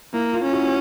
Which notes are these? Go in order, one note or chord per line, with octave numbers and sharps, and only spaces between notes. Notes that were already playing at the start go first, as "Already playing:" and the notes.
A#3 E4
F4
C#4
E4 F#4